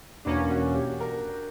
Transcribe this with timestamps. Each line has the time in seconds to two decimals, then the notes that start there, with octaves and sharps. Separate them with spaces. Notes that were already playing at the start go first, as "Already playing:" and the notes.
0.25 E2 B2 A#3 C#4 D4
0.51 F#4
0.75 G4
1.00 A#4